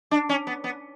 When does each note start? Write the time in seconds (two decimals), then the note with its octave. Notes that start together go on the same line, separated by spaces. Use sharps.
0.11 D4
0.29 C#4
0.47 B3
0.64 B3